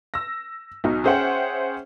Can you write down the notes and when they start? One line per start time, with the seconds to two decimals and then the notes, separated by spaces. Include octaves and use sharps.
0.14 E6 A#6
0.84 B1 D#4 F#4
1.04 C#4 G#4 C5 E5 F#5 G5